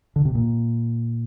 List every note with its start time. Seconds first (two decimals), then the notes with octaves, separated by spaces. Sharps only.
0.16 D3
0.25 C3
0.35 A#2